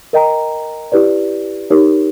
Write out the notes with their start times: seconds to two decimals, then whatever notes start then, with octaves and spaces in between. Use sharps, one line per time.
0.13 A#4 D#5 G5 A#5
0.92 E4 G4 B4 D5
1.70 D#4 G4 A#4 C#5